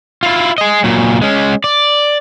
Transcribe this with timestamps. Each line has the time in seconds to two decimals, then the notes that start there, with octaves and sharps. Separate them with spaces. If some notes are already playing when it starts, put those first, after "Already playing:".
0.23 E4 F4
0.58 G#4 D#5
0.84 A#2 F#3
1.22 G#3 C#4
1.64 D5